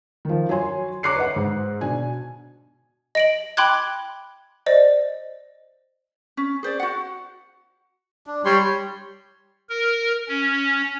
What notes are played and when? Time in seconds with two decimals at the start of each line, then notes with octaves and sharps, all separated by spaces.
0.25 D#3 F3
0.49 F#3 C#5 G#5 C6
1.03 C#5 A#5 D6 F#6 C7 C#7
1.16 B4 D#5 F#5
1.36 G#2
1.81 B2 D4 G#5
3.15 D#5 D7 F#7
3.57 G5 B5 C6 D6 F#6 G#6
4.66 C5 D5 D#5
6.37 C#4
6.63 G#4 C5 D5
6.80 F#4 F#5
8.27 D4
8.45 G3 C#5 C6
9.69 A#4
10.28 C#4